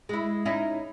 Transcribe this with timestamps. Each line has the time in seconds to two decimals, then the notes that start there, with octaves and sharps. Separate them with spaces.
0.09 G#3 E4
0.45 C#4 D#4 E4